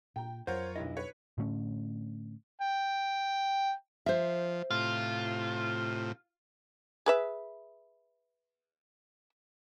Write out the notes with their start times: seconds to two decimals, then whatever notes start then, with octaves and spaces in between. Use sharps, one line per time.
0.16 A#2 G5 A#5
0.47 F2 F#3 F4 A#4 C5 C#5 F#5
0.76 B1 G2 E4 D#5
0.97 B4 C#5
1.38 A2 D3 A3 C#4
2.62 G5
4.06 F3 C5 E5
4.71 A2 C3 F4
7.06 G#4 B4 E5